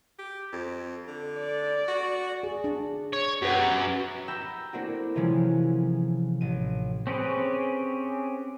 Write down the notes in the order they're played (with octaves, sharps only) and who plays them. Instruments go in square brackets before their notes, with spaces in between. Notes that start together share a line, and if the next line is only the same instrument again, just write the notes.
[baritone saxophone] G4
F2
D3
[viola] D5
[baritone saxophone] F#4
[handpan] G#4
D4
[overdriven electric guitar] C#5
[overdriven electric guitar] F#2 [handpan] G4 B4 F#5
[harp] G5 A#5 B5 E6
A3 A#3 C4 D4 E4 F#4
C3 E3 F3 G3 G#3 C#4
A1 D#7
[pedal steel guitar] C4 C#4 G4 G#4 B4